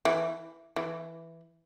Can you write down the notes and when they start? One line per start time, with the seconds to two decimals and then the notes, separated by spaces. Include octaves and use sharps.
0.05 E3
0.76 E3